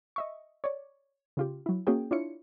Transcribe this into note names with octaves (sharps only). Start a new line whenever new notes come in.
D#5 E5 C#6
C#5 D5
C#3 F4 G4
F#3 E4
A#3 C#4 F#4 G#4 G5
D4 E4 F4 C#5 C#7